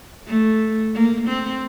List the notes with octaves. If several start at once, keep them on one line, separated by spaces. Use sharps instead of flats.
A3
A#3
C4